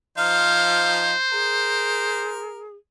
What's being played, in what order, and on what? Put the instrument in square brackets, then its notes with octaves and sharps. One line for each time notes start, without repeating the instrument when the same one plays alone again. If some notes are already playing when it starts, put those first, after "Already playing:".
[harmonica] F3 D#4 F5 [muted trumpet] C5 [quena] F6
[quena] G#4 [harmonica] A#4